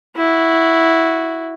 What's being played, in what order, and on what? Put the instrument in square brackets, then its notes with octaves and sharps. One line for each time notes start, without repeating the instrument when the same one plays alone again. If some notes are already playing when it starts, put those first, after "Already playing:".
[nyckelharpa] E4 F#4